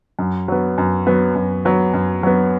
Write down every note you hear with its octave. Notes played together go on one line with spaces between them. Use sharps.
F#2
F#3 B3
F#2
F#3 B3
F#2
F#3 B3
F#2
F#3 B3